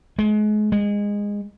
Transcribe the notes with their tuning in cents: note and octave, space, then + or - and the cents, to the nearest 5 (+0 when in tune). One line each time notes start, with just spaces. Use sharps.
G#3 +35
G#3 -20